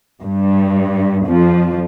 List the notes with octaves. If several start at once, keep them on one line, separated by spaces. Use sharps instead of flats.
G2
F2 F3